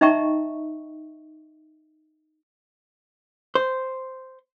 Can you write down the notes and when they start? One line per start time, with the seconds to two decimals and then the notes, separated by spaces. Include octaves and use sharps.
0.01 D#4 D#5 E5 G5 A#5 C#6
3.55 C5